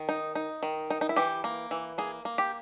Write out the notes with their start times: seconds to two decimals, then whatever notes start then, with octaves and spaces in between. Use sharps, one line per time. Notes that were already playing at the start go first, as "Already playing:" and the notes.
Already playing: D#3
0.09 D#4
0.35 D#4
0.63 D#3
0.90 D#4
1.01 D#4
1.09 E4
1.16 E3 G4
1.44 A#3
1.71 E3
1.98 A#3 G#4
2.25 A#3
2.38 G4